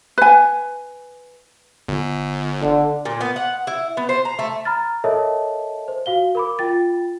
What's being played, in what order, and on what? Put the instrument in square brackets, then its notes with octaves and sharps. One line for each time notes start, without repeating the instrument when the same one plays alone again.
[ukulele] B4 G#5
[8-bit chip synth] G1
[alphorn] D3
[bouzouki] A#2
B3
F#5
E4
B3
C5
A#5
A3
[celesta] A#5 B5 F6 A6
A4 A#4 C#5 D#5 E5 A5
C5
F#4 F5 G7
A#4 B5 D6
F4 G5 A6